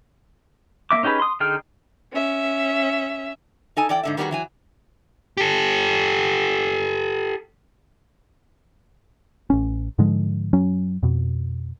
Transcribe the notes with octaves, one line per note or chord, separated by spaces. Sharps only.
A#3 C#4 E5 D6
C#4 D#4 G4 G#4 B4
C6 D#6
D3 D#4 G#4 G5 F6
C#4 E5
D#4 A4 G#5
E3 D5 G5
G#2 D3 E5
D#3 G3 B3 C4 F#4 G#4
E3 F#3 G#5
G4 A4
A1 C#4
G#2 D3 F3 G#3
F#2 F#3 C#4
F2 B2